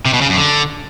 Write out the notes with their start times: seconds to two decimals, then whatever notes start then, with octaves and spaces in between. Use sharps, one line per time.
0.05 C3
0.13 B2
0.21 C#3
0.29 F#2
0.37 D3